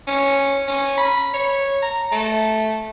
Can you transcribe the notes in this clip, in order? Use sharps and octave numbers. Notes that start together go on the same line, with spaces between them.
C#4
C#4
B5
C#5
A#5
A3